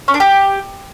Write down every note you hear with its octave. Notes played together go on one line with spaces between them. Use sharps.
C#4
D4
G4